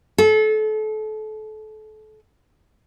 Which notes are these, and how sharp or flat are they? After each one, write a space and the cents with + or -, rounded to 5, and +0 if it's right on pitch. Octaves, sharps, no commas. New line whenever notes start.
A4 -30